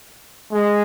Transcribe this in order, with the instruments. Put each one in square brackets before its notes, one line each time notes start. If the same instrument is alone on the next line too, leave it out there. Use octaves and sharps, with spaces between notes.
[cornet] G#3